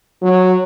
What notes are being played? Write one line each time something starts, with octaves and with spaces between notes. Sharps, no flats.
F#3